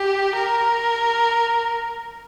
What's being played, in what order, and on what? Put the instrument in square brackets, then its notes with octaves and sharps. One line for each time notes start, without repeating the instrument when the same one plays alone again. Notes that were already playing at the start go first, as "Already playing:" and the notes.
Already playing: [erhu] G4
A#4